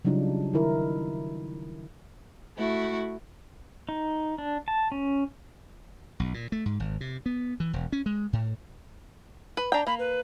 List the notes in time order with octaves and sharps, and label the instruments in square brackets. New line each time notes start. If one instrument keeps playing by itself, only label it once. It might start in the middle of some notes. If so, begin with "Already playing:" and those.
[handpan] C#3 F#3 G3 D4 D#4 F4
D#3 D#4 E4 A#4
[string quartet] A3 E4 F#4
[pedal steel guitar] D#4
D4
A5
C#4
[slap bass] B1
A#2
A3
G#2
G#1
C3
B3
E3
E1
C#4
G#3
A2
[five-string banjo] B4
[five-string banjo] D4 G5 [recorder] A#5
[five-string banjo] A#3 [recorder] B5
[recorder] B4